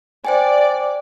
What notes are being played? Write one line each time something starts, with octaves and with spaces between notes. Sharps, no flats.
C5 D5 G5 G#5